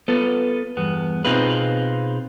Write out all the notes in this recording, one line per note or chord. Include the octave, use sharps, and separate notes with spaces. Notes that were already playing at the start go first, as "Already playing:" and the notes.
B3 F4 A4 B4
E2 G2 B3
B2 C4 D#4 F4 G#4 B4